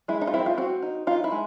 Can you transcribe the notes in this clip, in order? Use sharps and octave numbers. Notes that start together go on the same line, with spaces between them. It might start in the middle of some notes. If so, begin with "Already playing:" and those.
G#3 E4
D#4
F4
C4 E4
F4
C4 F#4
D#4
D#4 F4
E4
G#3